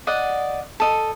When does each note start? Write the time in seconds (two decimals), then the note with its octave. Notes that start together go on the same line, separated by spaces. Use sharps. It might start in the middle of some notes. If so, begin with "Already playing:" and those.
0.07 D5 D#5 F#5
0.80 A4 D#5